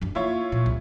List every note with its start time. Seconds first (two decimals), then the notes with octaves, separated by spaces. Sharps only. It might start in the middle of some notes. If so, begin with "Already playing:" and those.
0.01 F#2 D4
0.15 A#3 E4 F4 C#5
0.52 A#2
0.66 C2